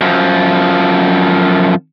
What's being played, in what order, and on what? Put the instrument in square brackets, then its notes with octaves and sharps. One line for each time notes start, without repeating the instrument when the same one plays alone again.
[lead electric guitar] F#2 F3